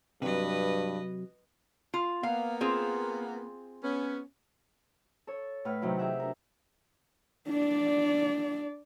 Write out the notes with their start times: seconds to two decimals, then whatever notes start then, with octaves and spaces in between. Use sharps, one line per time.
0.22 G2 C3 F#3 B4 D#5
1.94 F4
2.23 A#3 B3 F5
2.61 C4 F4 G#4
3.84 B3 C#4
5.27 A4 C#5
5.65 A2 B4 F#5 F6
5.82 C3 D#3 F#3 E4
5.98 G4 G#4 E5 F#5
6.20 D4 A#4
7.49 D4 D5